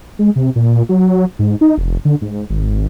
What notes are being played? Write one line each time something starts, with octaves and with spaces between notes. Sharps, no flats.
G#3
C3
A#2
F#3
G#2
D#4
F1
D3
G#2
G#1